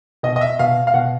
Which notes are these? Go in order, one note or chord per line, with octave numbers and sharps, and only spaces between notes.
B2 D#5
D#5
E5
B2 F5
F5
B2 F#5